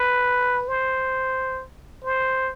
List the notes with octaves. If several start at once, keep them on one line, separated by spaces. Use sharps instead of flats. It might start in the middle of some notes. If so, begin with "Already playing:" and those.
Already playing: B4
C5
C5